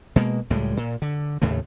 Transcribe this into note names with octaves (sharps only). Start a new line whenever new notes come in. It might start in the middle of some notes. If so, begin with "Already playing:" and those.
B2 G#3 A#3
C#2 A2 G3 G#3
A#2
D3
D#2 A2 C#3 A3